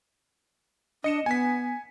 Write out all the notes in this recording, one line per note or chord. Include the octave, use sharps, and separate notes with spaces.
D4 D#5 C#7 E7
B3 G#5 B6